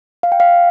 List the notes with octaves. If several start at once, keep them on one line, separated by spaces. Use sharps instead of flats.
F5
G5
F5